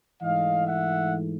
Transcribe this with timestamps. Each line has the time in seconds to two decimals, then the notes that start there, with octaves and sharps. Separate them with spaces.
0.21 G#2 E3 A3 D#5 F5
0.66 E5 F#5